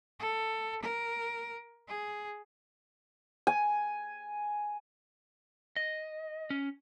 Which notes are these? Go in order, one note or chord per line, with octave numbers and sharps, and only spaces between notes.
A4
A#4
G#4
G#5
D#5
C#4